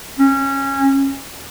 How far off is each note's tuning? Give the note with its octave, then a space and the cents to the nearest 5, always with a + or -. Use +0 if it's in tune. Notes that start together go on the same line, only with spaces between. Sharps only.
C#4 -20